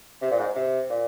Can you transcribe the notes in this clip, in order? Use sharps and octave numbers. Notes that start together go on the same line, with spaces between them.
C3
A#2
G#2
C3
A#2